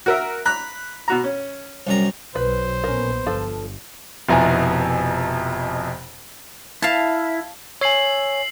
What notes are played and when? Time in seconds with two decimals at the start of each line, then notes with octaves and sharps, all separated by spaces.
0.06 F#4 A#4 E5
0.46 A#5 B5 F#6
1.08 B2 F#4 A#5
1.24 C#4
1.87 C2 F#2 A#5
2.35 B1 F#3 B4 C5
2.84 A#1 B3 C#4 A#4
3.27 G1 F3 A4
4.29 F1 F2 B2 E4 G#5 A#5
6.82 E4 F5 A5
7.81 C#5 G#5 E6 C7 F#7